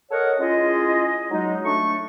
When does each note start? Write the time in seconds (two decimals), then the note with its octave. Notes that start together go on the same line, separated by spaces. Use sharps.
0.11 A4 A#4 C#5 D#5 F#5
0.39 G#3 C#4 E4 F4 G#4 D#5
1.30 F#3 G#3 D#4
1.65 A3 D4 C#6